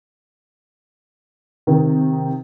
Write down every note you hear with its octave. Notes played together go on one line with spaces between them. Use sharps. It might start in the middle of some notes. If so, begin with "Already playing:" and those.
C3 D#3